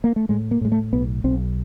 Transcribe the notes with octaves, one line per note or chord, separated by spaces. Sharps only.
A#3
A3
A2 G#3
A#3
A2 G#3
A3
B1 B3
B1 C4